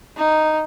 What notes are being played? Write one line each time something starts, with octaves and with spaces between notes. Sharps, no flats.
D#4